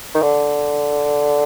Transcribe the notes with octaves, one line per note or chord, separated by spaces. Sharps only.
D#3
D3